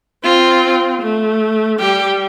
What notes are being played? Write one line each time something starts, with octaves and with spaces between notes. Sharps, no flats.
C4 F4
A3
G3 G4